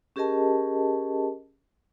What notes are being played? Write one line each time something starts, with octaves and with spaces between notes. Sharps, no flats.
C#4 G4 G#4 A#4 D#5 A5